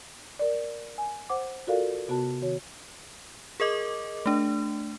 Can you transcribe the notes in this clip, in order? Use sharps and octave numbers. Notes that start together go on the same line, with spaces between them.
A#4 D5
G#5
C5 F#5 D6
F4 F#4 A4 A#4 D5 F5
C3 B3 F#4 A5
D#3 F#4 C#5
G#4 A#4 D#5 D6
A3 D4